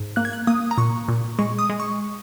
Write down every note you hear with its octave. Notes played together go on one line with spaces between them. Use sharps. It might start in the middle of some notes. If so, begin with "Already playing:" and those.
Already playing: G#2
A#3 F#6
G#6
F#6
A#3 D#6
A#5
A#2 C#6
A#2
G#3 C#6
D#6
G#3
C#6